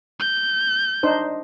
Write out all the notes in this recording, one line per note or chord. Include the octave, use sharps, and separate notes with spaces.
G6
D4 D#4 C5